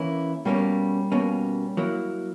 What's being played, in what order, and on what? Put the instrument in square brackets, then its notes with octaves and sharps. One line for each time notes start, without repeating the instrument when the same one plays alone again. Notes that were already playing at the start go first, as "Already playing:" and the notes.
Already playing: [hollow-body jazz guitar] E3 A#3 C#4 E4
[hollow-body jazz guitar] B2 A#3 C#4 [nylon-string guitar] G3
[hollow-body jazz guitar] B2 A#3 C#4
F#3 A#3 E4